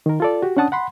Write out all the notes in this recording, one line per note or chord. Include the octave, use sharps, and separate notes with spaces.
D#3 A#4
F4 A4 D5
F#4 G4
C#4 D4 F#5 A5 D#6
F#5 B5 C6